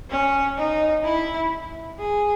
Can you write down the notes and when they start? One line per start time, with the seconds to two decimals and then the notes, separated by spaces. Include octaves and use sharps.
0.11 C#4
0.58 D#4
1.04 E4
1.99 G#4